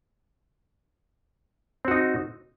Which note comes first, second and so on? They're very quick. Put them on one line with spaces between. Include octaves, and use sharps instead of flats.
C4 F#4 D#4